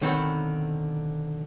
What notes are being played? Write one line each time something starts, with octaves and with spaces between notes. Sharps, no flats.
B1 D3 D#3 C4 B4 C#5